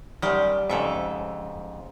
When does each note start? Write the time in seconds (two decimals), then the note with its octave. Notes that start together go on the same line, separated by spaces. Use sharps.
0.22 F#2 D#3 G3 G4
0.70 F2 G#2 C#3 A4 E5